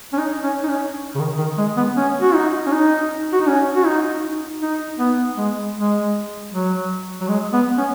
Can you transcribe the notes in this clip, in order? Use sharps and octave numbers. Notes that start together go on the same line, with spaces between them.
C#4
D#4
C#4
D#4
C#4
C#3
D#3
D#3
G#3
B3
C#4
F#4
D#4
C#4
D#4
F#4
D#4
C#4
F#4
D#4
D#4
B3
G#3
G#3
F#3
F#3
G#3
B3
C#4